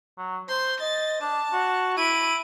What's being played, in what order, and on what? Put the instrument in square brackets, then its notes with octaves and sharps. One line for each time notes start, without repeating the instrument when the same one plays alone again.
[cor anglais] F#3
[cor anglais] C5 [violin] C6
[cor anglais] D#5 [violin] A6
[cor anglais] D4 [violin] A5
[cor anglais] F#4
[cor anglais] E4 [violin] D7 D#7